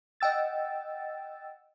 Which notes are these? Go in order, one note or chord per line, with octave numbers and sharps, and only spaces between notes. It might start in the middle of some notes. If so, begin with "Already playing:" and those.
D#5 F#5 G5 E6 A6